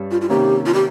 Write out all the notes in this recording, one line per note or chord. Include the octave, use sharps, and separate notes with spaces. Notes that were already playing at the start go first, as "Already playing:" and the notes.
Already playing: G2 G3 C#4
F4
F4
C3 D#3 A#3 C#4 G4
F4
G4